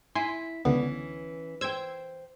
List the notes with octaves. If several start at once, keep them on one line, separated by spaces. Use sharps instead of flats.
E4 G#5 C6
C#2 D3 E3 B3 C#4
C5 G5 E6 G#6